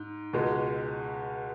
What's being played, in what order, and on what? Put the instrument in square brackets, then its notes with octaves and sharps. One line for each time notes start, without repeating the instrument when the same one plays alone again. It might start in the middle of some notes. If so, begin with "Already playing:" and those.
Already playing: [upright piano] G#2
C#2 B2 G#3